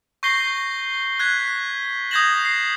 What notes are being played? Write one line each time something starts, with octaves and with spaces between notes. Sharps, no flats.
C#6 G6 A#6 C7 G7
F#6 G#6 B6
D#6 G6 G#6 A#6 E7 F#7
C7